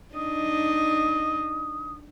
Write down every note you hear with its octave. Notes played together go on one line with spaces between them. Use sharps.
D4 D#4 D#5 D#6